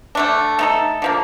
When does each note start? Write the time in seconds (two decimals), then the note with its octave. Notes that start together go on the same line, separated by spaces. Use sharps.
0.15 D3 A3 D4
0.59 A3 D#4 A4
1.02 D3 F3 A#3